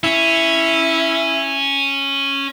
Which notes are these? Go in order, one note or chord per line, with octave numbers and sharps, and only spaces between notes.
C#4 E4